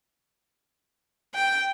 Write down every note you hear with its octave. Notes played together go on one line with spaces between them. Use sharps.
G5